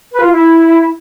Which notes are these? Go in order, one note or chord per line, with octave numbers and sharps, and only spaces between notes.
B4
F4
E4